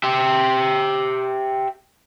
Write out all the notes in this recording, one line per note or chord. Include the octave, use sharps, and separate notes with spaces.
G4 E5